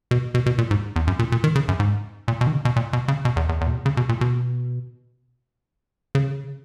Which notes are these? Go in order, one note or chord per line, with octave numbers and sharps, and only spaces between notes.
B2
B2
B2
A#2
G#2
E2
F#2
A#2
A#2
D#3
C#3
F#2
G#2
A#2
B2
D#3
C#3
B2
A#2
B2
C#3
B2
E2
E2
E2
A#2
B2
C#3
B2
A#2
B2
C#3